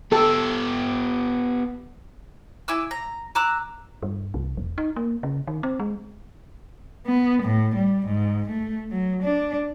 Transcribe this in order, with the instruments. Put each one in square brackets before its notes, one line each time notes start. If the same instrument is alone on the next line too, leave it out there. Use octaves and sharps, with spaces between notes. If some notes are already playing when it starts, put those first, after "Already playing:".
[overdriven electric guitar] B3 G4 [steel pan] A4
[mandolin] E4 G#5 D6 E6
A#5
A#5 D6 E6 F#6
[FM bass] G2
C2
E1
D#4
A#3
C#3
D#3
C4
G#3
[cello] B3
A2
G3
G#2
A3
F#3
D4